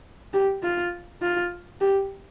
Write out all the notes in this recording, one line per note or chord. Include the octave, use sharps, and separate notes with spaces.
G4
F4
F4
G4